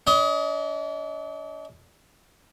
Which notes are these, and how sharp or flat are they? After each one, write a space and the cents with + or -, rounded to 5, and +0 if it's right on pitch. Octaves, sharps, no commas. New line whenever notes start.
D4 -40 D#5 +25